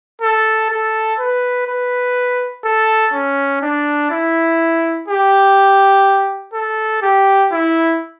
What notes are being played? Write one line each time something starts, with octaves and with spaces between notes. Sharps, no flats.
A4
A4
B4
B4
A4
C#4
D4
E4
G4
A4
G4
E4